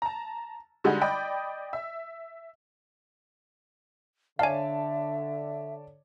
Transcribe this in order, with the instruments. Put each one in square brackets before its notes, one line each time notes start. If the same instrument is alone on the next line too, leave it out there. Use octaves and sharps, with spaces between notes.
[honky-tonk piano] A5 A#5
D3 G3 G#3 D#4 F#4
D5 D#5 G5 B5
E5
[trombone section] D3 [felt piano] C#5 D5 A5 [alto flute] E5 [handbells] F5 G#5